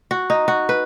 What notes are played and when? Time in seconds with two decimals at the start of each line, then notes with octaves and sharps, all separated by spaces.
0.11 F#4
0.30 D#4
0.48 F#4
0.69 B4